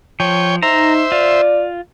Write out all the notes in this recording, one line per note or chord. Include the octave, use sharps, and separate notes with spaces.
F3 C#5 G5
D#4 C5 E5 A#5
F4 D5